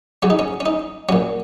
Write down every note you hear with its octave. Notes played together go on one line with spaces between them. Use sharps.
C#3 F#3 C#4
D#4
C#4
C#4
D#4
A#2 F#3 C#4